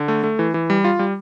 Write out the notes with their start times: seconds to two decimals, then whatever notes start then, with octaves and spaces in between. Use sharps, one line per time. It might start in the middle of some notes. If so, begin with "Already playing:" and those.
Already playing: D3
0.08 A3
0.24 A3
0.39 E3
0.54 E3
0.70 G3
0.84 F4
0.99 G3